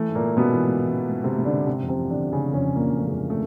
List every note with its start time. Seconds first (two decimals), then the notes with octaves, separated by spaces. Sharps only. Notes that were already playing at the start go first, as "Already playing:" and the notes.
Already playing: E3 A3
0.09 G#2
0.15 A#2 A#3
0.22 E3
0.37 G#2 B2 B3
0.52 E3
0.67 G#2
0.80 E3
0.95 E3
1.09 G#2
1.24 G#2 C3 C4
1.38 G#2
1.45 D3 D4
1.52 G#2
1.67 C3 C4
1.82 F2
1.88 C3 C4
1.95 E3
2.10 F2 D3 D4
2.25 E3
2.33 C#3 C#4
2.40 C3
2.53 F2 C#3 C#4
2.68 F2
2.75 A#2 A#3
2.83 E3
2.97 F2 A3
3.08 F2 G#3
3.30 A3